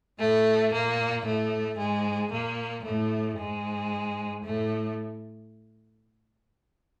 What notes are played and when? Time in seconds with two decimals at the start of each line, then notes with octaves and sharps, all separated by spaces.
0.19 A2 A3
0.72 A#2 A#3
1.25 A2 A3
1.78 G#2 G#3
2.31 A#2 A#3
2.84 A2 A3
3.38 G#2 G#3
4.44 A2 A3